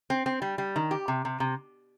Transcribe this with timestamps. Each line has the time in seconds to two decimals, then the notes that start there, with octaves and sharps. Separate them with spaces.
0.10 C4
0.26 C4
0.42 G3
0.58 G3
0.76 D#3
0.91 G4
1.08 C3
1.25 C3
1.40 C3